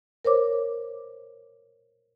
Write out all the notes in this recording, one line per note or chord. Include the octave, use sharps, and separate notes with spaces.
A#4 C5 C#5 D6